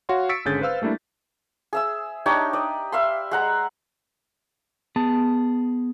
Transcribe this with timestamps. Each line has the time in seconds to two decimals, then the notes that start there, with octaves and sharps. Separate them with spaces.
0.09 F#4 C#5 F5 F#5 C6
0.29 C#6 E6 A6 B6 C#7 D7
0.45 G#1 D3 C#4 G#4 G6 A6
0.61 B4 C5 F5 E6 F6
0.82 G3 A3 A#3 D4 E4
1.73 G#4 E5 E6
2.26 D4 D#4 G4 C#5
2.53 D5 D#5
2.92 E5 F5 B5 C6
3.31 G#3 F#5 A#5
4.96 B3 G#4 A5